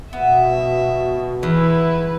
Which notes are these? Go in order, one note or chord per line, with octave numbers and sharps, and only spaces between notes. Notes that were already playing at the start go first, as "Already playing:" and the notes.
B2 B3 E5
E2 E4 B4